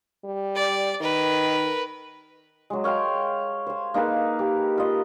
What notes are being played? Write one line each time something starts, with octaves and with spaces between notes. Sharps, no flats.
G3
D5
D#3 A#4 B4
F#3 G#3
C#5 F5 G5 C6
C5 G#5
A#3 D#4 G#4 B4
G4
F4 D#5